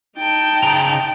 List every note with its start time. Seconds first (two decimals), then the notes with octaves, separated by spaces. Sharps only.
0.19 D#4 G5 A5
0.63 C#3 A#5